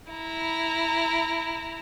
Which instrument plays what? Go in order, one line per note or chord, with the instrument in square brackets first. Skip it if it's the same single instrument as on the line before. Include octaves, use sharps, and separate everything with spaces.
[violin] E4 A#5